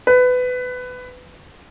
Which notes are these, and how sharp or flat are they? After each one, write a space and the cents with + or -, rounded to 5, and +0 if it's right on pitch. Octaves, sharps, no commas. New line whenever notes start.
B4 +20